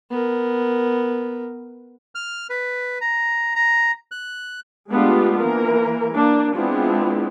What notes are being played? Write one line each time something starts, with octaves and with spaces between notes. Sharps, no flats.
B3 A#4
F6
B4
A#5
A#5
F#6
G#3 A3 B3 D4 F4 G4
E3 A#3 A#4
A#3 D4
G#3 B3 C4 D4 E4 F4